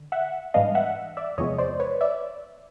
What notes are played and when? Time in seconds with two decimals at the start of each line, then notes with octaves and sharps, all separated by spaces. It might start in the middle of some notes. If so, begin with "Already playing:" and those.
Already playing: D3
0.12 E5 F#5
0.54 G#2 E3 G3 B3 D4 D#5 F5
0.75 E5 F#5
1.17 D5 E5
1.38 E2 C3 F3 G#3 B3 C#5 D#5
1.59 C5 D5
1.80 B4 C#5
2.01 D5 E5